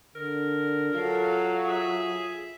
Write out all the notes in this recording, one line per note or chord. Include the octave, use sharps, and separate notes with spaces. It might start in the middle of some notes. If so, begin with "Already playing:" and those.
D3 A#4
F#3 F4 A4 F5
G#4 E5